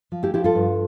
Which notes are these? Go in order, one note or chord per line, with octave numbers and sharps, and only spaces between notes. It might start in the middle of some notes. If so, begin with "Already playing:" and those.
F3
E4 G4
F3 E4 G4
F4 A4
G2